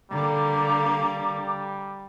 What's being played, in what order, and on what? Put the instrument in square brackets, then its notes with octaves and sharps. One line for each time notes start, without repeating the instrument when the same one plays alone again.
[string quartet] D3 A#3 [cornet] G3 [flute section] A#5 D6